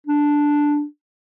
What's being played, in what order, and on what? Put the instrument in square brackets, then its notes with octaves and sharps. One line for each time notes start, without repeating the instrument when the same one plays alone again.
[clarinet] D4